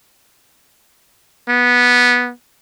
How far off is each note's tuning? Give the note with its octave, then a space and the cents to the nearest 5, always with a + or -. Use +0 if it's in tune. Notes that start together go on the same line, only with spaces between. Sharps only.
B3 -10